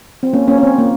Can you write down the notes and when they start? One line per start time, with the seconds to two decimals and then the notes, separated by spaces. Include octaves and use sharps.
0.23 C4
0.33 A#3 C#4
0.48 A#3 C#4
0.58 C#4
0.63 C4
0.78 A#3